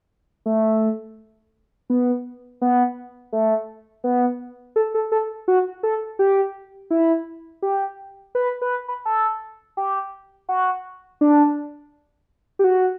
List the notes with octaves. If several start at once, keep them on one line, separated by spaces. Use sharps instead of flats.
A3
B3
B3
A3
B3
A4
A4
A4
F#4
A4
G4
E4
G4
B4
B4
B4
A4
G4
F#4
D4
G4
F#4